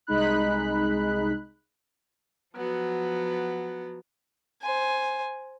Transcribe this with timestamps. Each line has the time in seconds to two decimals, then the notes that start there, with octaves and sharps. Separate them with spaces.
0.07 C2 G#3 D#4 B5 F#6
2.54 F3 F#3 B3
4.62 C5 G#5